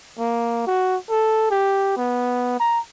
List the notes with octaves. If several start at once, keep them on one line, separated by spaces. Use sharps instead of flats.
A#3
F#4
A4
G4
B3
A#5